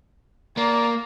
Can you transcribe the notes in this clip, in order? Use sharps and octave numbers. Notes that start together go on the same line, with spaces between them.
A#3 D5 A#5